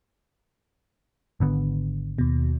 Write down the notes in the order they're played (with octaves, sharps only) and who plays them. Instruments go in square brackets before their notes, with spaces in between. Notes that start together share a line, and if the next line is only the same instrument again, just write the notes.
[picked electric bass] G#1 D3 B3
[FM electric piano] D#2 B2